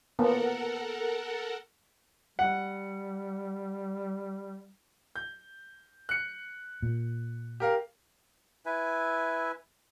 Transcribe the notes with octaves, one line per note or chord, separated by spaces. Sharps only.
A#3 B3 A4 A#4 F#5
G3 F#5
G6
F#6 C#7
A#2
G4 A#4 F5
E4 B4 E5 G#5